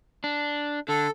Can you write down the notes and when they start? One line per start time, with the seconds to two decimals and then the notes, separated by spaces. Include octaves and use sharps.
0.24 D4
0.88 D3 A4